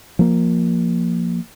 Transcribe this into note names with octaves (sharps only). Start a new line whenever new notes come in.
F3 A#3